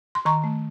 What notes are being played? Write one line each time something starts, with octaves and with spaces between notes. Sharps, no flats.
C6
D#3 A#5 C#6
A3